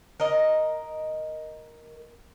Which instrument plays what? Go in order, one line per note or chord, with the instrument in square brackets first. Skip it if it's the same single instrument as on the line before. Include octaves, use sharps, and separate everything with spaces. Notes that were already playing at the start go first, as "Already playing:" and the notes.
[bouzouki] A#4 D#5